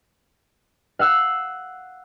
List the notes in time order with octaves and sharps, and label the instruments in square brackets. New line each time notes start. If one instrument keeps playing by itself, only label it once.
[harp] F5 F#5 E6 F#6